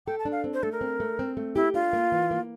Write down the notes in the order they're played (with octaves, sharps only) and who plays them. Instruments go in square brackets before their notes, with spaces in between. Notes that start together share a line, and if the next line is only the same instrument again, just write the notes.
[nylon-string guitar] A4 [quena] G5
[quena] A5
[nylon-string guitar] D4
[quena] F5
[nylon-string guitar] C4
[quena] C5
[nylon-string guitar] A3 [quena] A4
[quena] A#4
[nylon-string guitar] C4
A3
C4
A3
[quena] E4 [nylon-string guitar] G4
[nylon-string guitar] D4 [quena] F4
[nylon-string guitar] A#3
E3
A#3